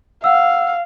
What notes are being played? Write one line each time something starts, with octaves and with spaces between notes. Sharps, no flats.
F5 F#5 E6